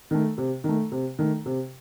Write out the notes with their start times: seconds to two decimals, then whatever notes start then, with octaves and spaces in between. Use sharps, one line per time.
0.11 D#3 A3
0.38 C3
0.64 D#3 A3
0.92 C3
1.19 D#3 A3
1.46 C3